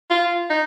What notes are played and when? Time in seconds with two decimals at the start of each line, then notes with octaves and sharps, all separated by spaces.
0.10 F4
0.50 D#4